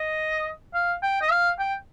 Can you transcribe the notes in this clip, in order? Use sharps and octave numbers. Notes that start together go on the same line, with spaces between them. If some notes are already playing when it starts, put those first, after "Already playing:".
Already playing: D#5
F5
G5
D#5
F5
G5